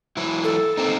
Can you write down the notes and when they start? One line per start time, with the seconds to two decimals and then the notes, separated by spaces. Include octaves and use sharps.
0.17 E3 F#3 E4
0.44 A4
0.77 A#3 C4 D#4